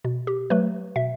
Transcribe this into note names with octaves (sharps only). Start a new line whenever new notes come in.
B2
G4
F#3 A3 B4
B2 E5